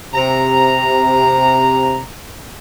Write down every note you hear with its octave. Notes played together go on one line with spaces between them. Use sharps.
C3 A#5